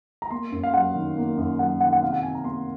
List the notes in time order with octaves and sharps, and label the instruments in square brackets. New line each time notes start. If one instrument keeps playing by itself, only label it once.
[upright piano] A#5
A#3 C6
F#2
F5
F#3 F#5
D#3
A#3
F#2
F#3 F#5
D#3 F#5
F#5
C3 F5
F#5
C3 G#5
A#5
A#3 C6